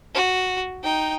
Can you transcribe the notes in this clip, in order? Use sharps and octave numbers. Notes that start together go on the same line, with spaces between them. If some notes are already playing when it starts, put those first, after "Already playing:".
F#4
D#4 G5